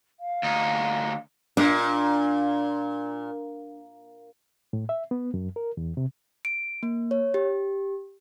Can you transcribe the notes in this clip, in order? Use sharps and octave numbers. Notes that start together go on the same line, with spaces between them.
F5
D2 D#4
A#2 D4
A2
E5
B3
F#2
A#4
E2
C3
D7
A#3
C#5
G4